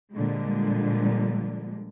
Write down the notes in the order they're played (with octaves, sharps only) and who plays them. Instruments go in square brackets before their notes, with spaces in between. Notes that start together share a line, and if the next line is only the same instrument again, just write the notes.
[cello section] A#2 D3 F3 G3 G#3